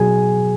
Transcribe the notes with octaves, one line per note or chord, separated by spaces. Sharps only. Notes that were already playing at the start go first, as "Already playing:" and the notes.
Already playing: B2 F#3 G#4 G#5